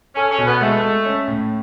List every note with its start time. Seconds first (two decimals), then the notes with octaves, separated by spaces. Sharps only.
0.16 C#4 A4
0.31 C#4
0.38 B2
0.46 B3
0.61 G#3 A3
0.83 G#3
1.05 C#4
1.28 A2